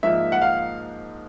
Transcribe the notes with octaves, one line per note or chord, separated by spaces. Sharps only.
G#2 F3 A#3 E5
F#5
F5